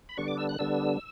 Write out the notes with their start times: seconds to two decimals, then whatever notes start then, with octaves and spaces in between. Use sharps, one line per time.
0.09 B5
0.17 D3 G3 B3 D4 C#6
0.28 D6
0.38 E6
0.49 F#6
0.59 D3 G3 B3 D4 E6